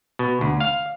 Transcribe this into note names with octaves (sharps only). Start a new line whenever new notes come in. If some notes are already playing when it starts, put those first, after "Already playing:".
B2
D2
F5